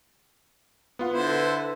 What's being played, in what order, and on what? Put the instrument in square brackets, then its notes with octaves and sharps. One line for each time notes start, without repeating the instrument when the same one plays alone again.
[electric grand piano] B3 F4 F#5
[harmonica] D3 E4 C5
[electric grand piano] A4 B4